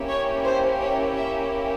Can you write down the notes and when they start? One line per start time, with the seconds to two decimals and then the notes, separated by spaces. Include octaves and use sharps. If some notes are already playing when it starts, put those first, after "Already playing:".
Already playing: A#3 C#4 E4 G4
0.10 C#5
0.45 C5
0.81 C#5
1.16 E5